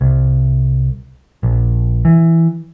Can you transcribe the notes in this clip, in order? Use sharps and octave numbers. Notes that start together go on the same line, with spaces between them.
C2
A#1
E3